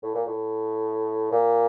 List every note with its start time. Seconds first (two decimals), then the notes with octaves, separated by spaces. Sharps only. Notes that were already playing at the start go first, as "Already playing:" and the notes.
0.03 A2
0.14 A#2
0.26 A2
1.31 A#2